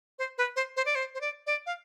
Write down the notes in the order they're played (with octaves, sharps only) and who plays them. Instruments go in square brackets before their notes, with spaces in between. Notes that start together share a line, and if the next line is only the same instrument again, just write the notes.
[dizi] C5
B4
C5
C5
D5
C5
C5
D5
D5
F5